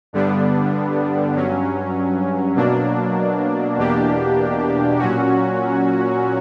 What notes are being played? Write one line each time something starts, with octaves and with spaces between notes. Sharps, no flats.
G2 D3 G3 B3 D4
G2 F#3 C#4
B2 F#3 A#3 D4
E2 B2 A#3 D4 G4
A#2 F#3 C#4 F#4